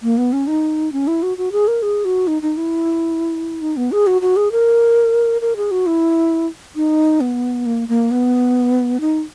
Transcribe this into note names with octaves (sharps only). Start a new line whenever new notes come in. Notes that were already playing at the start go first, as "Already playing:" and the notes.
A#3
B3
C#4
D#4
C#4
E4
F#4
F#4
G#4
A#4
G#4
F#4
D#4
D#4
E4
D#4
B3
G#4
F#4
F#4
G#4
A#4
A#4
G#4
F#4
E4
D#4
B3
A#3
A#3
B3
D#4